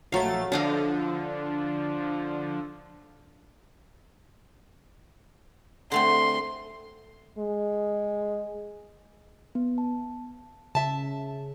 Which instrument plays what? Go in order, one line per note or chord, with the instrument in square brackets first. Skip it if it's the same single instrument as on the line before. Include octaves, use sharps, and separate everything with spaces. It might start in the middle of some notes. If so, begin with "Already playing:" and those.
[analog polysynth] A#1 A3 A6 [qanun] F#3 F5
[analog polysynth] D3 F3 [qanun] D4 D#5 F5
[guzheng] D3 A3 C4 [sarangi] C6
[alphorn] G#3
[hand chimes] B3
A5
[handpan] C#3 [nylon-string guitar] E5 A5